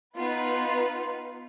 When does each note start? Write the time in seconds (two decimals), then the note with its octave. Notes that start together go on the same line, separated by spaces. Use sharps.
0.16 B3 D#4 F4 B4